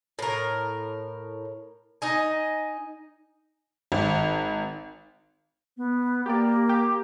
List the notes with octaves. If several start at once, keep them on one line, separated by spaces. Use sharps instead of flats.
A2 A#4
D#4 D#5 G#5
G#1
B3
A#3 G4 D5
G4